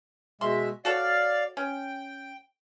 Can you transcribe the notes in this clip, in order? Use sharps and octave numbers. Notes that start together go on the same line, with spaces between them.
B2 G#3 E5 C6
F#4 A4 C#5 D5 F5
C#4 G5